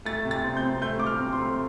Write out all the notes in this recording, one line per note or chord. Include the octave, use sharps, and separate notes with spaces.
A3 A6
C3
A6
C4
G6
C4
A3 G6
A3 D6
F6
C4
C6
A3